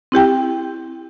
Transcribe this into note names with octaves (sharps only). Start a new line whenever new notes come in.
C4 E4 G4 G5